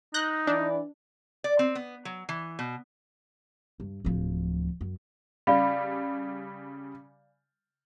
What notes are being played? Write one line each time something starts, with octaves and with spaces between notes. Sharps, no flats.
D#4 F#6 G6 A#6
E3 D4 D5
D5
C4
B3
F#3
E3
B2
G2
D1 F3
F#2
C#3 G3 D5 F5 B5